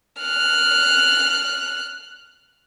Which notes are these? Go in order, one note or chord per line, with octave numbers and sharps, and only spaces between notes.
F6 F#6